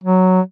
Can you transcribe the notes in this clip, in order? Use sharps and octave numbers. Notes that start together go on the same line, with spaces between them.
F#3